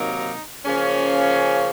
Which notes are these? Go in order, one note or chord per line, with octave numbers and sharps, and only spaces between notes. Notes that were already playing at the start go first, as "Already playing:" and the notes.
Already playing: C3 D#3 F#3 A#3 D#4
C#3 F3 A#3 C#4